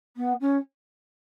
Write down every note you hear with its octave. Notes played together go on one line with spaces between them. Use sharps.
B3
C#4